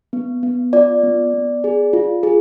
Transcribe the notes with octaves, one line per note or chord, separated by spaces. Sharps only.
B3
B3
F4 D5
B3
B3
G#4
F4
G#4